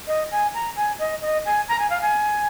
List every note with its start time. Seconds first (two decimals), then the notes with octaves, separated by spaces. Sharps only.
0.07 D#5
0.31 G#5
0.54 A#5
0.76 G#5
0.99 D#5
1.22 D#5
1.45 G#5
1.68 A#5
1.79 G#5
1.90 F5
2.01 G#5